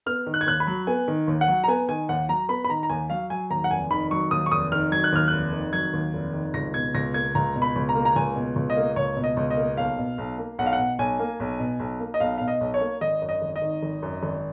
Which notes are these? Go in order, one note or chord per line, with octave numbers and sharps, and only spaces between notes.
B3 F6
D#3
F#6
G#6
D#2 F#6
B5
F#3
B3 G#5
D#3
D#2
F#5
F#3
A#5
B3 G#5
D#3 G#5
D#2 F#5
F#3 A#5
B3 B5
B5
D#3 A#5
A#5
D#2 G#5
F#3 F5
F#3 G#5
D#2 A#5
F#5
F1 G#5
D#3 B5
F#3 C#6
D#2 D#6
C#6
F1 D#6
D#3 F6
F#3 G#6
F#6
D#2 F6
F1 F#6
D#3
F#3 G#6
D#2
F1
D#3
C#2 A#6
B2 G#6
C#2 A#6
A#3 G#6
C#2 A#5
B2
B5
C#2
A#5
A#3
A#5
C#2 G#5
B2
C#2
D#5
A#3
C#2 C#5
B2
D#5
C#2
D#5
A#3
B1 F5
B2
B1
A#3
B1 F#5
F5
F#5
B2
B1 G#5
A#3
B1
B2
B1
A#3
D#5
B1 F5
B2 F5
D#5
B1
C#5
A#3
G#1 D#5
F#2
D#5
G#1
D#5
D#3
G#1
F#2
G#1